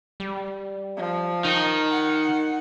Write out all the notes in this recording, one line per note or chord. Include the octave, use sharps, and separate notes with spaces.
G3
F3
D#3 D#4
F#5